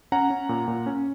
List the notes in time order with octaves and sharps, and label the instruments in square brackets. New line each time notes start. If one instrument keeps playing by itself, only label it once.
[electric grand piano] C#4 F#5 A#5
C#4
A#2
A#2
C#4